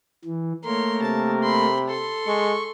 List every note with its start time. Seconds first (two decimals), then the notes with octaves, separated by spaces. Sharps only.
0.25 E3
0.65 A3 A#3 A#4 C#5 C6
1.02 C3 A5
1.43 B5 C6
1.88 A4 C6
2.27 G#3 C#6